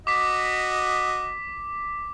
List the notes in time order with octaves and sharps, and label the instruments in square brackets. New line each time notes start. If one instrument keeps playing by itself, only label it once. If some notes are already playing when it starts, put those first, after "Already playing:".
[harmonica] F#4 D#5 [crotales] D6 B6